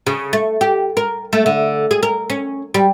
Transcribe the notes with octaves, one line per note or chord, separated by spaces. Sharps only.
C#3
A3
G4
A#4
A3
D3
G#4
A#4
C#4
G3